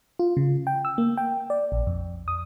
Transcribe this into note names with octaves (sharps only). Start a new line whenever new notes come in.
F4
C#3
G5
E6
A#3
G5
D5
A#1
F2
D#6